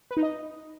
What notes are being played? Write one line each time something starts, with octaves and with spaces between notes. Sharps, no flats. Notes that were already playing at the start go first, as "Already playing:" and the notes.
B4
D#4
D#5